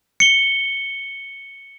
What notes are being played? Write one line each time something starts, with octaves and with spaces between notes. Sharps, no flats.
C#7 G7